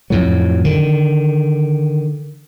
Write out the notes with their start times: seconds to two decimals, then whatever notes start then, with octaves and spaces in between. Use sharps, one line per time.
0.10 F2 A2 F#3
0.64 D3 D#3